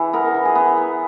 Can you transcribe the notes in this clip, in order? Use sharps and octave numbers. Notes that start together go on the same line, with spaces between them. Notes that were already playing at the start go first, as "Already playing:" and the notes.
Already playing: E3 G#4
B3 A#4
E3
G#4
B3
B3